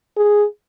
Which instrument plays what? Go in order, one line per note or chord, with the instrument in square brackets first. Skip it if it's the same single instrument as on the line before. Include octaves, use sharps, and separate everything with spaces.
[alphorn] G#4